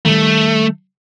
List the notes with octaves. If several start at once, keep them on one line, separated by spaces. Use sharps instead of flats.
D#3 G3 A3